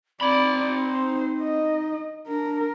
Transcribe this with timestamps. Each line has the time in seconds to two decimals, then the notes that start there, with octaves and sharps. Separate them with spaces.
0.21 C4 D#4 D5 B5
0.83 C5
1.42 D#5
2.28 D4 A#4